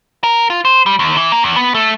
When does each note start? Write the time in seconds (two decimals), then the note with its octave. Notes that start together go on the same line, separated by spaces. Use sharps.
0.24 A#4
0.50 F4
0.65 C5
0.86 G3
0.99 D#2
1.17 E3
1.32 A#3
1.44 E2
1.56 B3
1.74 A3